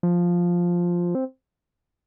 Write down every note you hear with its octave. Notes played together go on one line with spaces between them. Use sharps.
F3
C4